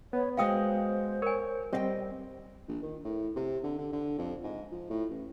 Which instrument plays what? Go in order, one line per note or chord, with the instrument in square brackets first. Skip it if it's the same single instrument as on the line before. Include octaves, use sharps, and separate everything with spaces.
[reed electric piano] B3 [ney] C#5
[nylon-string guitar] G#3 F#4 D#5 [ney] C5 [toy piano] F5 G5 D#6
[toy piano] A#4 G#5 [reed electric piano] C#5
[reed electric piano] G3 C4 [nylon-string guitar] D#5 F5 G5
[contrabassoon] A#1
D#3
A2
C3
D3
D3
D3
F2
G#2
F3
A2
A1